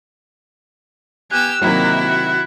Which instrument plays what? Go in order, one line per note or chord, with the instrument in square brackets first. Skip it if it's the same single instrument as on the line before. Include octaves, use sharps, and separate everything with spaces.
[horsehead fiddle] B3 G#5 [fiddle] G4 E6 [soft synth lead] F#6
[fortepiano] C3 D#3 F#3 [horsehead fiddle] A#3 D#4 [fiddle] E4
[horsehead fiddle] F#4